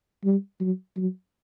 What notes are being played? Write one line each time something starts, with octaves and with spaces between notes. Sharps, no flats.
G3
F#3
F#3